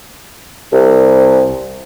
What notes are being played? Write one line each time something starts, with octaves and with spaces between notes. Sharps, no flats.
C2